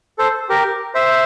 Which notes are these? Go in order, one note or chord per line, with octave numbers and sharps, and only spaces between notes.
A4 C5
G4 A#4
C5 E5